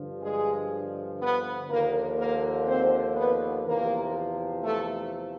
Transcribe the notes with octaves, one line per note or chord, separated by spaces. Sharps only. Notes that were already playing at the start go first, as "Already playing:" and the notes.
Already playing: G2 D3 F3
G#3 G#4
B3 B4
D#2 D3 F3 A#3 A#4
A#3 A#4
C4 C5
B3 B4
E2 C3 F3 A#3 A#4
A3 A4